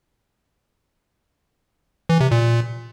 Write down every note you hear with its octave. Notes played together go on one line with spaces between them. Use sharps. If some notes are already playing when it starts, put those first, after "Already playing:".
E3
C3
A#2